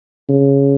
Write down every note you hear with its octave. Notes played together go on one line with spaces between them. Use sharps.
C#3